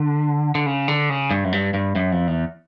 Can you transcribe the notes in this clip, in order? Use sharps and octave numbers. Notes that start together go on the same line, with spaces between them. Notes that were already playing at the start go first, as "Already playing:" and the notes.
Already playing: D3
D3
C#3
D3
C#3
G2
F#2
G2
G2
F#2
F2
E2